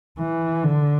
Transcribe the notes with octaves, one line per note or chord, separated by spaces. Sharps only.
E3
D3